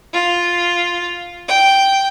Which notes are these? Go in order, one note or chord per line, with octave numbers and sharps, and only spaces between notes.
F4
G5